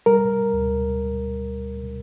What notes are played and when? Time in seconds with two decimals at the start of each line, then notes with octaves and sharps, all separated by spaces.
0.06 G3 A#4
0.54 D2